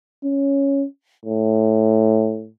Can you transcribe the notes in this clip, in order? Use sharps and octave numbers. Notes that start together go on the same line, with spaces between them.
C#4
A2